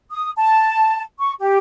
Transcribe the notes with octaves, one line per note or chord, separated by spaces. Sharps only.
D#6
A5
C#6
G4